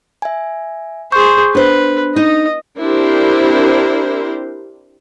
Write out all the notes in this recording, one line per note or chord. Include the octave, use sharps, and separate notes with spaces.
E5 G#5
G#4 C5 C#6 G6
B3 D4 B4 C5
D#4 D#5
C4 D4 E4 G4 A#4 C5